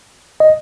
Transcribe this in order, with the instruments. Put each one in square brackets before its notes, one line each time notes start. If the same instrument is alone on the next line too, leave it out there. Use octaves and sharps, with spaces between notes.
[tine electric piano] D#5